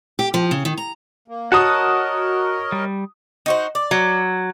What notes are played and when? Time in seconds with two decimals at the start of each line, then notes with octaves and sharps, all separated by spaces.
0.19 G4
0.34 F3
0.51 C#3
0.65 D#3
0.78 A#5
1.28 A#3
1.52 F#4 A#4 C#5 D#5 F#5 A5 A#5 D#6
2.72 G3
3.46 D#4 F#4 C5
3.75 D5
3.91 F#3